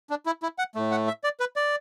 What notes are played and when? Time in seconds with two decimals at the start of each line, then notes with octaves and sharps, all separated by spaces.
0.10 D4
0.26 E4
0.43 E4
0.59 F#5
0.75 A2 A3
0.91 F#5
1.07 E5
1.24 D5
1.40 B4
1.56 D5